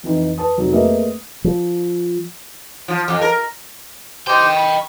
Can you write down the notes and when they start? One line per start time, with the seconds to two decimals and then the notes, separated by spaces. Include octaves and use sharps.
0.03 F2 E3 D#4
0.38 B4 A5 D#6
0.58 F1 F#3 D#4
0.72 A3 A#3 G#4 B4 D#5 E5
1.44 F3
2.88 F3
3.08 F2
3.21 A#4
4.27 G4 C5 D#5 G5
4.56 B5 C#6